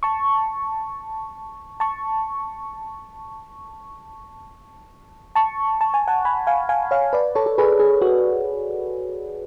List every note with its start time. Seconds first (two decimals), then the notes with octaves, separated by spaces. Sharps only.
0.03 A5 C#6
1.80 A5 C#6
5.35 A5 C#6
5.81 A5
5.94 G#5
6.08 F#5 A5
6.25 G#5 B5
6.47 F5 G#5
6.69 F5 G#5
6.91 C#5 F5
7.13 B4 D5
7.35 A4 C#5
7.46 A4
7.58 G#4 B4
7.79 G#4
8.02 F#4